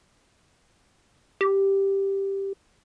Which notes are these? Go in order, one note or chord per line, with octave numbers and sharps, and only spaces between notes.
G4